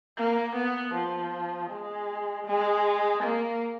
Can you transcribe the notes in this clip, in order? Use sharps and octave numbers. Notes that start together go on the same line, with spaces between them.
A#3
B3
F3
G#3
G#3
A#3